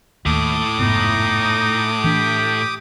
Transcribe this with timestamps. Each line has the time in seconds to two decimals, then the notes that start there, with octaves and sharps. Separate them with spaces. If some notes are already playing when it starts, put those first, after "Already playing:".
0.26 D#2 A2 D6 D#6
0.79 F1 G#2 B3 D#4
2.04 E3 D4 G4